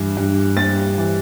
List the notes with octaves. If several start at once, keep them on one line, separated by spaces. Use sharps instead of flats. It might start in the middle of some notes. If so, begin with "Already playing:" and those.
Already playing: G2 E3
G2
G3 A6
E3